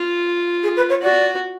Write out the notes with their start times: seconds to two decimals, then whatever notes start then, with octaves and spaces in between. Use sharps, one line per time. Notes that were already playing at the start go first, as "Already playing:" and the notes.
Already playing: F4
0.63 G#4
0.76 B4
0.89 C#5
1.02 F#4 D5